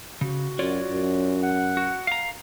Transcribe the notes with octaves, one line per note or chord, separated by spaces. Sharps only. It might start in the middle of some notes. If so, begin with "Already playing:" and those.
C#3 F#4
F#2 F4 C#5 D5
F#2
F#5
F#4
F5 A#5